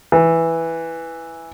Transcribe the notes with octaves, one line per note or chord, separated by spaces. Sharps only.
E3